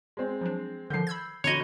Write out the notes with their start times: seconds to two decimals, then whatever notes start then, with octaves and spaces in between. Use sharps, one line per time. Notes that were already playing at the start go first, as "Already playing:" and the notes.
0.17 G#3 C4
0.41 F3 F#3 D4
0.90 D3 D#3 F3 G6 C7
1.07 B5 E6 G#6
1.44 D3 F#4 C#5 D#5 A#5 B5 G#6